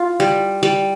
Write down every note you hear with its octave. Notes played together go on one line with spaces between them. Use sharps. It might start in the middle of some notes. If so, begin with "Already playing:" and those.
Already playing: F4
G3
G3